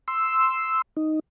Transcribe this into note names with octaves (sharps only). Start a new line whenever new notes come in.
C6 E6
D#4